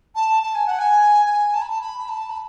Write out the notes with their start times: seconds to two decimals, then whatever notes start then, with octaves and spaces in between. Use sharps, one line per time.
0.15 A5
0.43 A5
0.55 G#5
0.66 F#5
0.78 G#5
1.25 G#5
1.53 A5
1.61 B5
1.69 A5
1.81 B5
2.09 A5
2.29 B5